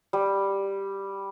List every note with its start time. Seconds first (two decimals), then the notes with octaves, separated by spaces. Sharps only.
0.13 G3